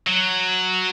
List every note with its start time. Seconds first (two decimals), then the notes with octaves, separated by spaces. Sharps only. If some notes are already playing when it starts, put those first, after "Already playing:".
0.07 F#3